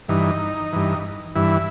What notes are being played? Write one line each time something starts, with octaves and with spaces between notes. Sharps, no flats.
G2 E3 D#4
G2 E3
G2 E3 E4